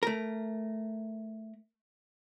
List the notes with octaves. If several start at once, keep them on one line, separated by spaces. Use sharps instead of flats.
A3 A#4